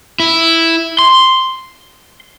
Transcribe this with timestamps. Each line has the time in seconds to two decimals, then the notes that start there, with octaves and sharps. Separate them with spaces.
0.20 E4
0.99 C6